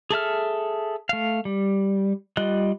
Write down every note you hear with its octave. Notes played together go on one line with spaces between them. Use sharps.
G#4 A4 E5 F6
A3 F5
G3
G3 F4 D#5 F#6